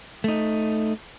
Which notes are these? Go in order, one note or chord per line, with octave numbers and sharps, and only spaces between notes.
A3 D#4